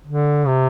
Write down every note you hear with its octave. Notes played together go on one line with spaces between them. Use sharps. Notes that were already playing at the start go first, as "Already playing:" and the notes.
D3
C3